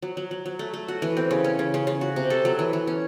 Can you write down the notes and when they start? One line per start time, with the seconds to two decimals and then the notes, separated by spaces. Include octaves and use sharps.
0.02 F#3
0.17 F#3
0.31 F#3
0.46 F#3
0.59 A3
0.74 A3
0.88 F#4
1.02 E3
1.17 C4
1.31 C#3
1.44 C#4
1.59 C#3
1.74 C#3
1.87 C#3
2.01 F#4
2.16 C3
2.30 A4
2.45 F#3
2.59 E3
2.73 E3
2.87 C#4